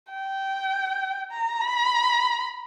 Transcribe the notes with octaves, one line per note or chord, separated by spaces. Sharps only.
G5
A#5
B5